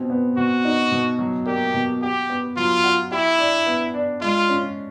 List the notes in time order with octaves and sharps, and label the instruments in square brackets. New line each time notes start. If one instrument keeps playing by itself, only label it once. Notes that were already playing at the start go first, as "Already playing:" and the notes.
Already playing: [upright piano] B2 C4
B3
[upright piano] B2 [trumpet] F#4
[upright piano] D#4
B2
F#3
[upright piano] A#3 [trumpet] G4
[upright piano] B2
[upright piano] F#4 [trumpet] G4
[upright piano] B3
[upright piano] F#3 [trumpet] F4
[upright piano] F#4
[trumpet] E4 [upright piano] G4
[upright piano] D4
B3
D4
[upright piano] G#3 [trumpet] F4
[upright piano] C#4